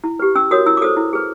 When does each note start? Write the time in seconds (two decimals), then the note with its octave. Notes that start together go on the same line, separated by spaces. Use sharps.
0.04 E4
0.19 G4 B4
0.35 C#4 E6
0.51 F#4 A#4 C#5 D#6
0.66 E4 E6
0.77 D6
0.82 A4 C5 D#6
0.97 E4
1.13 G#4 B4